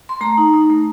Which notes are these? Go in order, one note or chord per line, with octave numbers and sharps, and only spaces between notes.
C6
A3 A#5
D#4
D#4
A3